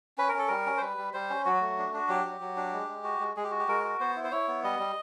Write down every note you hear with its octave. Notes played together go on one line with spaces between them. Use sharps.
C#4 B4
A#4
C#4 A4
G3 A#4
C#4
C5
G3 B4
G3
G3 C5
C#4
F#3 F#4
A3
D4
D4 F#4
F#3 G4
F#3
F#3
D4
G#3
G#3
F#4
G#3
G#3 G#4
G4
F#4
G4
G#3 A#4
F#4
B3 C5
E4
C5
E4 C#5
B3
G3 D#5
G3